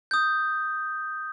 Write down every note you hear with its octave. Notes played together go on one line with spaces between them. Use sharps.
D#6 G6